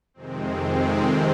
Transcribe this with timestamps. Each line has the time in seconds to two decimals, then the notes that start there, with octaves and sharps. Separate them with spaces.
0.14 F2 C3 D#3 G#3 C4